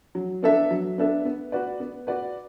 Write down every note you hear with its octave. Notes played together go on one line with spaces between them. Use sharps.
F#3
B3 D4 A4 E5
F#3
B3 D4 A4 E5
B3
F#4 B4 D5
B3
F#4 B4 D5